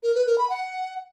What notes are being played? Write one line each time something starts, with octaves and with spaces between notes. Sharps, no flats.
A#4
B4
A#4
B5
F#5